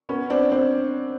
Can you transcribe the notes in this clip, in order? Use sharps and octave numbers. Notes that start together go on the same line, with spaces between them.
B3 C#4
C4 D4
C4 D4